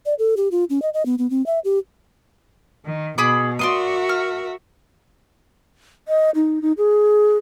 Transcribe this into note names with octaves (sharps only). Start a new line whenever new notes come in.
D5
A4
G4
F4
C#4
D#5
D#5
B3
B3
C4
E5
G4
D#3
B2 G#4 B5 D6
F#4 A#4 D5 E5 C6 D#6
F6
D#5
D#4
D#4
G#4